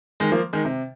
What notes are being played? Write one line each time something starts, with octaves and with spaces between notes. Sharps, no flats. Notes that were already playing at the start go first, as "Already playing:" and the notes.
D#3 G#3
F3 A#3
D#3 G#3
C3